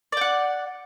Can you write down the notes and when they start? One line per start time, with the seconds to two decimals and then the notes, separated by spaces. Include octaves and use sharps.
0.12 D5
0.17 G5
0.21 F#5